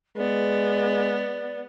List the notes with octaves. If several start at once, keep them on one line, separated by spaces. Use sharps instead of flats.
G#3 B3 D5